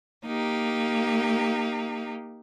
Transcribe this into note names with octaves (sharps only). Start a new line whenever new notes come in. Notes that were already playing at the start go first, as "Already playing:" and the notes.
A#3 D#4 G4